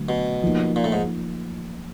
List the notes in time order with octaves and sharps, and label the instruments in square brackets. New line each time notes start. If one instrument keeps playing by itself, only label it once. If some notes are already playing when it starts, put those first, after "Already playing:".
Already playing: [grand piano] D3 F#3 A3
[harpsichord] B2
[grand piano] F3 A#3 D#4
[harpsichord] A#2
A2
G#2